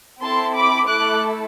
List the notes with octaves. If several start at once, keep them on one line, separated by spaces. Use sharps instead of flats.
C4 E4 A4 A5 C6
B5 D6
A3 E4 A4 D6 F#6